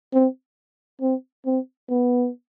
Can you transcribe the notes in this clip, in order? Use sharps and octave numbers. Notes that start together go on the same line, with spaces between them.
C4
C4
C4
B3